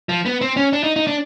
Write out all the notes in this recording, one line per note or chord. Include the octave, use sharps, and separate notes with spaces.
F3
B3
C4
C#4
D4
D#4
D#4
D4